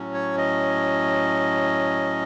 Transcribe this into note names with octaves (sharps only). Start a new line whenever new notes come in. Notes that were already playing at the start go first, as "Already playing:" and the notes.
Already playing: A2 F#3 C#4
C#5
D#5